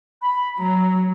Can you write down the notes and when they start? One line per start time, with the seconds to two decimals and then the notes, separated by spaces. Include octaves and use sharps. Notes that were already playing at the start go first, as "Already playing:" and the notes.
0.22 B5
0.59 F#3 A#5